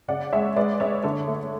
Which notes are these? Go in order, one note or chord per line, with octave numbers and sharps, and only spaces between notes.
C#3 D5 F#5
G#3 C#5 E5
G#3 B4 D5
G#3 C#5 E5
D3 A4 C#5
A3